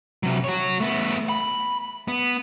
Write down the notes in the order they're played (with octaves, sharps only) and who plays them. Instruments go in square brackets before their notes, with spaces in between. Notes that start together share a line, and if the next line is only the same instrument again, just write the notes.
[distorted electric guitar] C3 F#3
F#4 C#5
A3 B3
B5
B3